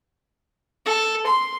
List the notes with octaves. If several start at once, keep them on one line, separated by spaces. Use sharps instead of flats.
A4
C6